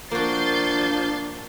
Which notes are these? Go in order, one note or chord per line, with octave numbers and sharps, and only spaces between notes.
F3 A#3 D4 F#4 G6 A6 C7